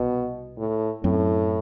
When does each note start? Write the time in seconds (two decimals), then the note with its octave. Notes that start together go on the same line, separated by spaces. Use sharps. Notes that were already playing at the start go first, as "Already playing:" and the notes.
Already playing: C2 B2
0.58 A2
1.04 F#2 A2 F#3 C4